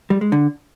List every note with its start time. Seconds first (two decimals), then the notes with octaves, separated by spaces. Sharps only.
0.10 G3
0.21 G#3
0.32 D3